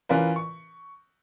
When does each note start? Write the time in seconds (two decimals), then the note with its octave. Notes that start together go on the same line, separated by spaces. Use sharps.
0.09 E3 C#4 F4 A#4 B4
0.36 C#6